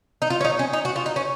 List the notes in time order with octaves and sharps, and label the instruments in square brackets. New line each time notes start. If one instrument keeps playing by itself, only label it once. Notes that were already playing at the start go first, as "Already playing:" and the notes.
[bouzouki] D#4
F4
C#4
D#4
C#4
D#4
F#4
F4
D#4
C#4